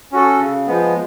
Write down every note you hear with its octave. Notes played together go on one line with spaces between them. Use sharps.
C#4 F#4 A4
C#3
F3 G#3 B3